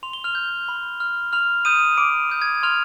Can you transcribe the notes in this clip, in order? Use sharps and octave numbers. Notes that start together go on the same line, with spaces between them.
C6 F7
G7
F6 F7
G6
B5
F6
B5 F6 F7
D#6 G6 D#7
B5 D6 D7
D#6 G6
G#6
C6 F6 F7